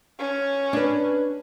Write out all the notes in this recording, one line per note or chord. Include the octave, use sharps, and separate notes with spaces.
C#4
D4 B4